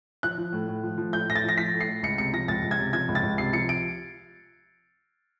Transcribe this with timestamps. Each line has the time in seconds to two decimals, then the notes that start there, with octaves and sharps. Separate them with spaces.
0.23 F3 F#6
0.38 F3
0.53 A2
0.68 A2
0.83 F3
0.98 F3
1.13 A2 G6
1.28 A2 A#6
1.36 A6
1.44 F3 A#6
1.58 F3 B6
1.73 A2
1.81 C7
1.88 A2
2.03 C#2 C#7
2.18 C3 C#7
2.33 F3 A#6
2.48 C#2 A6
2.63 C#2
2.71 G#6
2.78 C3
2.93 F3 G#6
3.08 C#2
3.15 A6
3.23 C#2
3.38 C3 C7
3.53 F3 C#7
3.69 D7